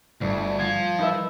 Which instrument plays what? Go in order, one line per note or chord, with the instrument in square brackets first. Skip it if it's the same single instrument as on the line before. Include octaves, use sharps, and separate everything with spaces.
[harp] G1 [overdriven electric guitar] D2
[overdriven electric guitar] F3 F4 [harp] G#6
[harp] D#4 B4 E5